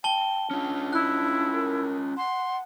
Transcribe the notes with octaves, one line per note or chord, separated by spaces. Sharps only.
G5 A5 G7
C#4 D4 F4
E4 F#6
A#4
F#5 C6